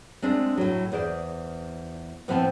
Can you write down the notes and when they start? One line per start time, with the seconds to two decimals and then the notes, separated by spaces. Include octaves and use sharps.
0.22 G#3 A3 C4 D4 F4
0.57 A2 F#3
0.92 E2 G#4 C5 D5
2.28 A2 F3 B3 C4 A5